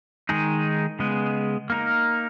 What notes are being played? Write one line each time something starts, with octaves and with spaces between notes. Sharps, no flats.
D#3 G#3 D#4 G#4
C#3 G#3 B3
A#3 D#4 A#4